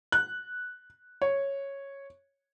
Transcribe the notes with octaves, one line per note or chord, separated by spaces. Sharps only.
F#6
C#5